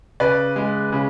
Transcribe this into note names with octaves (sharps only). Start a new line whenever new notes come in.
C#3 B4 D5
G#3
C#3